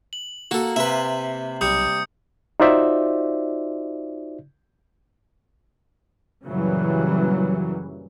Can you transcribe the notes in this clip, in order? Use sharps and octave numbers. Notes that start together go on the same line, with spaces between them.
F#7
A#3 F#4 A4
C3 B4 E5
B1 G3 D#6 G6 C#7
D#4 F4 F#4 C5 D5 E5
A#1 F#2 C#3 E3 F#3 G3